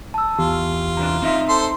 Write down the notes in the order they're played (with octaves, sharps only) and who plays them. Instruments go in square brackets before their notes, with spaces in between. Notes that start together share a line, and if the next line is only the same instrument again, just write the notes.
[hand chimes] A5 E6
[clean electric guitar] E2 [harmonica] F4 [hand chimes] G4
[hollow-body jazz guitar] C3 E3 D4 [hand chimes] A#5
[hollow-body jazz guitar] C4 D#4 E5
[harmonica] A4 C5 C6